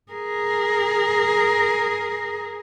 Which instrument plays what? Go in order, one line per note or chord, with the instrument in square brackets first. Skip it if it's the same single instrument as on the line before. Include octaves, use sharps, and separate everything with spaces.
[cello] G#4 A#4